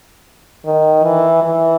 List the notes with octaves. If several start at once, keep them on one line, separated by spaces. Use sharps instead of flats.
D#3
E3
E3